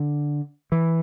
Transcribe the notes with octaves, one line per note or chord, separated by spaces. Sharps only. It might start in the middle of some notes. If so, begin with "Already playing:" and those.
Already playing: D3
E3